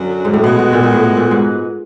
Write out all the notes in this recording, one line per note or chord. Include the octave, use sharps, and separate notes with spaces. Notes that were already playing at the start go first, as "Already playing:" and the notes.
Already playing: F#2 D3 F#3
G#2
A2
B2 G#3 B3 D#4 F#4 B4
B2
A#2
A#2
A2
G#2
A#2
G#2